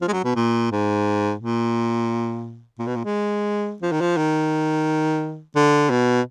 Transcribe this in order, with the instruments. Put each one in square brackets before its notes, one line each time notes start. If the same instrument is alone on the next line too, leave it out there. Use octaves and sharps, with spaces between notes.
[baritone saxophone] F3
G#3
F#3
B2
A#2
G#2
A#2
A#2
B2
A#2
G#3
F3
D#3
F3
D#3
D3
B2